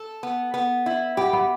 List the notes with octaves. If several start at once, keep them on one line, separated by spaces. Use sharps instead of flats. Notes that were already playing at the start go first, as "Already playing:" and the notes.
Already playing: A4
B3
B3
E4
B3 G4
B3